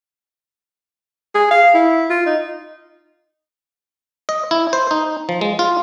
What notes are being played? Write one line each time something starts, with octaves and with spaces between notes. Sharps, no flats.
G#4
F5
E4
F4
D#4
D#5
E4
C5
D#4
F3
G#3
F4